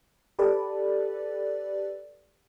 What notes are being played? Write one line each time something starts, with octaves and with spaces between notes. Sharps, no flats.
G4 A4 B4 D5